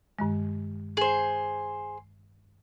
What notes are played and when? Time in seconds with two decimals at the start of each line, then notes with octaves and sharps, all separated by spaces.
0.19 G2 D#3 G#3
0.97 G#4 C5